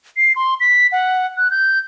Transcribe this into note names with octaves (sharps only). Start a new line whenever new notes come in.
C7
C6
B6
F#5
F#6
G6